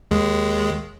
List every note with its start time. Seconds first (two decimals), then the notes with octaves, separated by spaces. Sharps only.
0.11 D#2 G#3